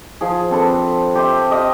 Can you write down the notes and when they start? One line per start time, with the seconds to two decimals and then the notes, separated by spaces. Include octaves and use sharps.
0.21 F3 G#4
0.50 C4 D4 A4 B4
1.15 G4 C5 E5
1.50 G4 D#5 F5 G5